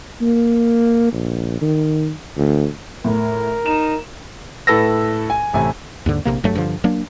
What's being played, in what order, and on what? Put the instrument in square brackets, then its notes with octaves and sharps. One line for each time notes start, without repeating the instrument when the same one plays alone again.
[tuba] A#3
A#1
D#3
D2
[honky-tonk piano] A2 [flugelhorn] A#4
[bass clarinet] D#4 [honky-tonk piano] E7
[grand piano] A2 A4 B4 E6 A#6
G#5
A1 C3 A3 G#5
[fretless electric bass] D#2 G#2 D3
A#1 F2 C3 A#3
G1 G2 F#3 A3
G2 D3 F3
F#3 A#3 D4